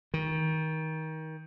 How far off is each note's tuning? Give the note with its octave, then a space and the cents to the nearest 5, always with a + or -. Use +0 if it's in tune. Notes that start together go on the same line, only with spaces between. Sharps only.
D#3 +25